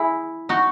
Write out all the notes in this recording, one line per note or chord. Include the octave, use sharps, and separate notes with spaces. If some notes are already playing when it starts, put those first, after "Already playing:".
Already playing: E4 G#4
D#4 F#4